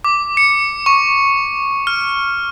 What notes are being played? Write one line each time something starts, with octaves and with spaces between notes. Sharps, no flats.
D6
C#7
C#6
F6